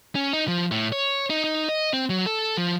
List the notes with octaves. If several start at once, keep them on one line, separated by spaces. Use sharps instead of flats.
C#4
D#4
F3
A2
C#5
D#4
D#4
D#5
C4
F#3
A4
F3